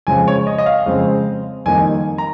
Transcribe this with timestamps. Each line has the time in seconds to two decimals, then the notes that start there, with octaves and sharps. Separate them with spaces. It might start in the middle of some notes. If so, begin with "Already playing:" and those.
0.07 F2 C#3 G#3 C4 G#5
0.28 C#5
0.47 D#5
0.58 D#5
0.66 F5
0.86 F2 C#3 G#3 C4
1.66 F2 D#3 G3 A#3 D#4 G#5
2.18 A#5